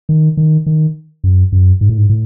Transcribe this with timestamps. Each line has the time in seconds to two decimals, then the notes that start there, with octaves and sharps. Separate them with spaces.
0.09 D#3
0.37 D#3
0.66 D#3
1.24 F#2
1.52 F#2
1.81 G#2
1.89 A2
1.98 G#2
2.09 A2